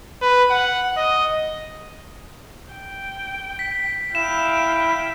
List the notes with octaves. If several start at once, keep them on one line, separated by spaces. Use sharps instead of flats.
B4
F#5
D#5
G5
B6
E4 F5 G5 E7